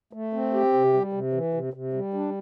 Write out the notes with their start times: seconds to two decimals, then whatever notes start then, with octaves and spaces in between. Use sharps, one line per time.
0.13 A3
0.33 C4
0.53 G4
0.73 C3
0.93 G3
1.13 C3
1.33 E3
1.54 C3
1.74 C3
1.93 G3
2.14 D4